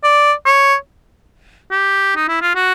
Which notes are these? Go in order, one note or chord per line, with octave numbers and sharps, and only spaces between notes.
D5
C#5
G4
D#4
E4
F4
F#4